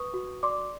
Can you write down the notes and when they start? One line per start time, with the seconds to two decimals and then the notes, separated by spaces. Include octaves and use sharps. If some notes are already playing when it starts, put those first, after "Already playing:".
Already playing: B4 C#6 D#6
0.14 F#4
0.43 D5 C6 D6